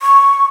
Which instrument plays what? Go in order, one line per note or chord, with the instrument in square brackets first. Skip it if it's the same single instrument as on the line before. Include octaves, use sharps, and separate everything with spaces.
[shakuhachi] C#6